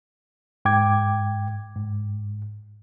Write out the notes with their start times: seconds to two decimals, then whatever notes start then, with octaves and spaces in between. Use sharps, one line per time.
0.65 G#2 G5 D6 G#6
1.76 G#2